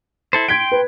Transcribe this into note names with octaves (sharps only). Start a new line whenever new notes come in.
E4 A4 C5
G5 C6 G#6 B6 D7
B4